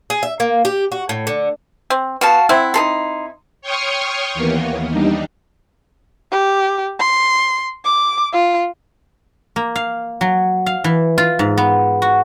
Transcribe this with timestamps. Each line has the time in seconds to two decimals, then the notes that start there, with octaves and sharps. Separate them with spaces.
0.10 G#4
0.23 E5
0.40 A#3
0.65 G4
0.92 F#4
1.09 A2
1.27 D3
1.90 C4
2.21 B3 F#4 F5 A5
2.49 C4 E4 F#5
2.74 D#4 A4 C6
3.61 C#5 G5 C6 C#6 D#6 F6
4.34 D#2 E3 A#3 B3
4.90 G3 D4 D#4
6.31 G4
7.00 C6
7.85 D6
8.33 F4
9.56 A#3
9.76 F5
10.21 F#3
10.66 F5
10.84 E3
11.18 F4
11.39 G#2
11.57 B3
12.02 F#4